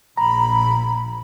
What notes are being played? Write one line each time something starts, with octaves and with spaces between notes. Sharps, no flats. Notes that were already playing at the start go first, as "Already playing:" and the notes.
A#1 A#5 B5